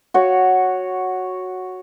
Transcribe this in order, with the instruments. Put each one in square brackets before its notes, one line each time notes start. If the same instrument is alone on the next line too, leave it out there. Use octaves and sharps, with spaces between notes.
[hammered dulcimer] F#4 C#5